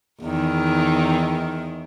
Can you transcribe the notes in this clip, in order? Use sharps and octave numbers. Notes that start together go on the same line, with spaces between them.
E2 D#3